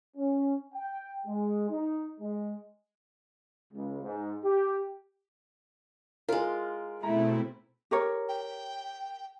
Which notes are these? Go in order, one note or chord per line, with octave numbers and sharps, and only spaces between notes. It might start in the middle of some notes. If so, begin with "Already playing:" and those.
C#4
G5
G#3
D#4
G#3
C#2
G#2
G4
G#3 F4 A#4
B2 A3 C4 E4 A#5
G4 A#4 C#5
G5